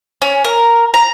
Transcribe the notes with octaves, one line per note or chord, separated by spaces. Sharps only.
C#4
A#4
A#5